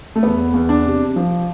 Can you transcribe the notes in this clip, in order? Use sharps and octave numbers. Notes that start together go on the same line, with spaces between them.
A3
E2 B3
E2
D4
C3
F3